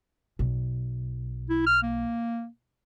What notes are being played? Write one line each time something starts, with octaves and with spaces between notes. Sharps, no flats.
B1
E4
F6
A#3